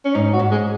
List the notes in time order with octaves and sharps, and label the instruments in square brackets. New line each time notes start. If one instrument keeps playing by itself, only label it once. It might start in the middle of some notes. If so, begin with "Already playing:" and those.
[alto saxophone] C#4
[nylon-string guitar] G#2 [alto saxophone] D#4
[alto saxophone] F#4
[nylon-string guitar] G#2
[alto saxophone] G#3